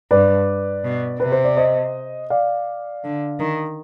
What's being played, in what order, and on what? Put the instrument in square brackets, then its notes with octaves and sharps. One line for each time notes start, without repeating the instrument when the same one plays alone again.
[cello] G2 [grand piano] B4 D5
[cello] B2
[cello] C3 [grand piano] B4
[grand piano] C5
D5
C5 D#5
D5 F5
[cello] D3
D#3